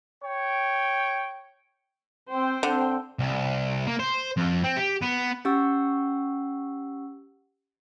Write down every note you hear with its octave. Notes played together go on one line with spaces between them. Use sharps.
C#5 G5
C4 C5 G5
D3 C4
C2
A#3
C5
F2
C4
G4
B3
C#4 G4 F#5 C#6 E6